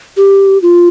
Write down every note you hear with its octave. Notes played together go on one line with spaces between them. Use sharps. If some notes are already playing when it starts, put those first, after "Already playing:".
G4
F4